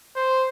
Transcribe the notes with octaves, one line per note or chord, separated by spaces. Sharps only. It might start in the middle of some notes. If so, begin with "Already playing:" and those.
C5